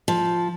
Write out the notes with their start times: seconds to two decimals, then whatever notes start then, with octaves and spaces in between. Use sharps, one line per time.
0.08 F3